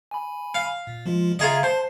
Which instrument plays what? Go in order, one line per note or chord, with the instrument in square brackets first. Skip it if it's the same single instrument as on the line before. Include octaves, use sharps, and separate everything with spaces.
[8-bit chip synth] G#5 B5
[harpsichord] F5
[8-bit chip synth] A#2
F3 G#3 F4
[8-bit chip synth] C#3 E5 A#5 [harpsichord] F4 G#4 D#5
[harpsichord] C5 [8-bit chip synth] A5